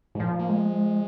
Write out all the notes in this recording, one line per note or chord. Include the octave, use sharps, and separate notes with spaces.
G#2
A#2 F3
A#3
G#3